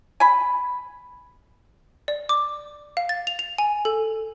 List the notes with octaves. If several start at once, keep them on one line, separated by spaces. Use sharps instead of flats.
G#5 B5
D5
D6
F5
A6
F7
F7
G#5
A4